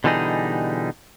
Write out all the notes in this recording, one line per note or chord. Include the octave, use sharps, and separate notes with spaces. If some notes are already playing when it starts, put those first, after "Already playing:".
B2 D3 E3 G3 D#4 G#4